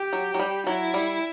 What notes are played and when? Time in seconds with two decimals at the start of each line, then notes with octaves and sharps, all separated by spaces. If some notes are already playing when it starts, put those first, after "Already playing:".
Already playing: G4
0.13 F#3
0.34 F#3
0.39 G3
0.67 F#3 E4
0.94 G3